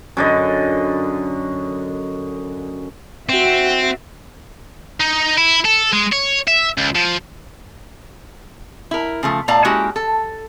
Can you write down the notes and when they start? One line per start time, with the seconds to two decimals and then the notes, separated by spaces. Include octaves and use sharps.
0.17 F#2 D3 D#5
3.29 C4 F#4 E5
5.00 D#4
5.38 E4
5.65 A4
5.93 G#3
6.13 C#5
6.48 E5
6.78 C#2
6.95 F3
8.91 E4 A#4
9.23 C#3 F3 A3
9.48 A2 B3 D5 F5 A5 A#5
9.65 G#3 A#3 C#4 E4 F#4 G4
9.96 A4